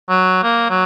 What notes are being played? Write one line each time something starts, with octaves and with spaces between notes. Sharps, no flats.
F#3
A#3
F#3